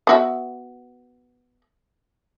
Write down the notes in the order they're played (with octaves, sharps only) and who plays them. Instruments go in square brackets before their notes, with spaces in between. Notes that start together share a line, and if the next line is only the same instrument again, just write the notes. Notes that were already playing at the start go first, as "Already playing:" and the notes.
[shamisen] B3 F#4 E5